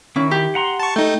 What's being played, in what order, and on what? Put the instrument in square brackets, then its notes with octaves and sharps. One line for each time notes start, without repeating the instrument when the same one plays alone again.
[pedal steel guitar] D#3 E4 [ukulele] C#4
[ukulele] G4
[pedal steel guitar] F#5 A#5 C6
[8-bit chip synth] A5 C#6
[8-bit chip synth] A3 D#4 [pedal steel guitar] G5